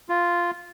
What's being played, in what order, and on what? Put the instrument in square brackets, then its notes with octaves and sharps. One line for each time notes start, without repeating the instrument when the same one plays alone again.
[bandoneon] F4